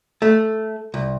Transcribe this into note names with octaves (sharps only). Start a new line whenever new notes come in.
A3
C2